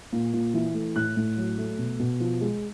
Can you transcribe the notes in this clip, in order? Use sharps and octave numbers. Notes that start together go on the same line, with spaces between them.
A#2
A#2
E3
A3
A2 F#6
A2
F#3
A3
B2
B2
F3
G#3